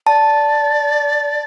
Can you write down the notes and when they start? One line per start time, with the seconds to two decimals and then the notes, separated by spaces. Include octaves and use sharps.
0.07 D5 A5